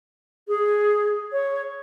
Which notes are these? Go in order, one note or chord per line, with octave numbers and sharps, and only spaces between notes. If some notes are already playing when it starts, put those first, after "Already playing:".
G#4
C#5